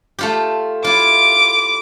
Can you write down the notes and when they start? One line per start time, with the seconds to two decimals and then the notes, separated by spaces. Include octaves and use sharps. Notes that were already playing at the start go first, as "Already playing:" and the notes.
0.19 A3 F4 G4
0.84 E4 F4 D6